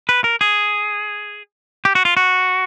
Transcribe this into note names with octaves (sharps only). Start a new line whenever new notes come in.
B4
A#4
G#4
G4
F#4
F4
F#4